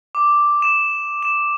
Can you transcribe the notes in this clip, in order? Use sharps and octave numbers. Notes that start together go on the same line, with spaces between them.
D6
E7
E7